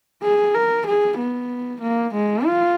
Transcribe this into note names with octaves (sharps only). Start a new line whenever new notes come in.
G#4
A#4
G#4
B3
A#3
G#3
F4